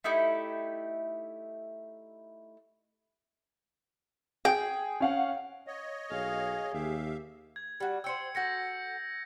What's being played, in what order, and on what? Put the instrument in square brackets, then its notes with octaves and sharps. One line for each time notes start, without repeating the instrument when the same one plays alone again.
[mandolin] A3 D#4 E4 G4
[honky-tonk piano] G#4 [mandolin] G5
[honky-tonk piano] C#4 F5 F#5
[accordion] C#5 D#5
[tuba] B1 [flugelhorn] G#4 [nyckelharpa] F5
[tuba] D#2 [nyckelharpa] G4 [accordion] E5 F5
[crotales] G#6
[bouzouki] G3 F#4
[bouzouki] C5 C#5 G5 [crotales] E6 C#7
[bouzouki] F#4 A4 [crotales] G6 A#6 C#7